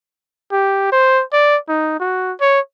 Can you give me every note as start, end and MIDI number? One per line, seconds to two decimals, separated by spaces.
0.52 0.88 67
0.92 1.22 72
1.33 1.57 74
1.68 1.96 63
2.00 2.32 66
2.41 2.60 73